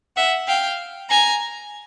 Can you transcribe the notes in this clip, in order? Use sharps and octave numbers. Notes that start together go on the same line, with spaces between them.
E5 F#5
F5 G5
G#5 A#5